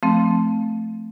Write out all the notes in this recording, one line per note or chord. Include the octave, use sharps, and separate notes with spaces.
F3 A3 C4